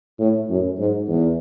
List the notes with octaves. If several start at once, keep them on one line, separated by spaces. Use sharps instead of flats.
A2
F#2
G#2
E2